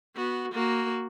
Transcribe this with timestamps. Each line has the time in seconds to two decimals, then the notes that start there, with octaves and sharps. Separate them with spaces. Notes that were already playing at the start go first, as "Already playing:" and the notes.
0.16 B3 F#4
0.52 A#3 F#4